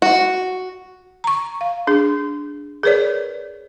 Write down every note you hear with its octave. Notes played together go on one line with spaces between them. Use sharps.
F#4
A#5 C#6
F5
D4 G#4
G#4 A#4 B4 C#5 D5